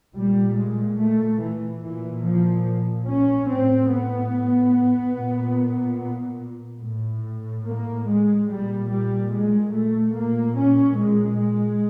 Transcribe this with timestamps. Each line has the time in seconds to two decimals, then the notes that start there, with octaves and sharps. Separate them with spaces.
0.15 A#2 G3
0.56 G#3
0.98 A3
1.40 E3
1.81 A#2 E3
2.23 F3
3.06 C#4
3.48 A2 C4
3.90 B3
5.14 A#2
6.81 A2
7.65 A#3
8.06 G#3
8.48 A#2 G3
8.88 G3
9.31 G#3
9.72 A3
10.14 A#2 A#3
10.56 C#4
10.97 G#3
11.38 G#3